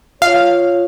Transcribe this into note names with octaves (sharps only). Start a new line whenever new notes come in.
F4 C#5 F5